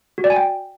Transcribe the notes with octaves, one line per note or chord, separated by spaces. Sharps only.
F#4
D5
G#5
G5